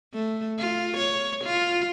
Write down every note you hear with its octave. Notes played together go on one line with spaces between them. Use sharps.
A3
F4
C#5
F4